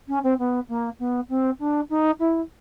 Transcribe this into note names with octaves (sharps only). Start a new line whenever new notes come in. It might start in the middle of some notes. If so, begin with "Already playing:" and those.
C#4
C4
B3
A#3
B3
C4
D4
D#4
E4